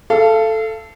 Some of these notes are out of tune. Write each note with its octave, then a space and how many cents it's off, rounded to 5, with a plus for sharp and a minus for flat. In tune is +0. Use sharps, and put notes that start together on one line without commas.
A4 +0 F5 -35